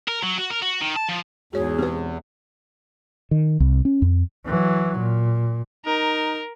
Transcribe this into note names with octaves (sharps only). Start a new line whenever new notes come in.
A#4
F#3
F#4
A#4
F#4
D#3
A5
F3
E2 G#2 F#4 G#4 C#5
E1 C4 G4 B4
D#3
C2
C#4
F2
E3 F#3
A#2
D#4 A#4